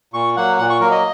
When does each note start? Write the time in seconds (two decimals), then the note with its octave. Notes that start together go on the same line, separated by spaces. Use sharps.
0.14 A#2 C#6
0.36 F#3 A#3 F#5
0.58 A#2 F#5
0.70 C#6
0.80 F#3 A#3 A#4
0.91 D#5